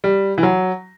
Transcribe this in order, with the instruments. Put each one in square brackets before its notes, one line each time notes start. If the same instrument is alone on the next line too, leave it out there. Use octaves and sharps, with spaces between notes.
[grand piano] G3
E3
F#3